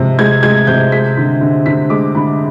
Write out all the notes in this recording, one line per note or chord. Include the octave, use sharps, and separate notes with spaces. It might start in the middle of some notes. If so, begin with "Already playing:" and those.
Already playing: C3 F3 G#3
G#3 G#6
G#3 G#6
C3 G6
G#3 B6
D3
D3
D3 B6
G#3 D6
D3 B5